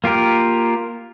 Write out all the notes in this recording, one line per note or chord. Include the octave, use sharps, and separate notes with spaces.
A#3 F4 G4 A#4